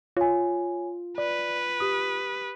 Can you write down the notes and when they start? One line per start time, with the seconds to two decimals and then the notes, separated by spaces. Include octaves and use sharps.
0.17 F4 C#5 G#5
1.18 B4 D5
1.80 G4 D#6